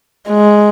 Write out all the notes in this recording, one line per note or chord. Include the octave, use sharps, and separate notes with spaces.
G#3